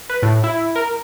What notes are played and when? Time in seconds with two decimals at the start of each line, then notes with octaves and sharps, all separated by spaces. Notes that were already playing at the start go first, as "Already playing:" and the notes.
0.09 B4
0.23 A2
0.44 E4
0.76 A#4